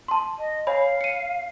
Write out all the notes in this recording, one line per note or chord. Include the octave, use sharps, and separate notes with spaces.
A5 C6
D#5
C#5 F5 G#5 B5
C#7 D#7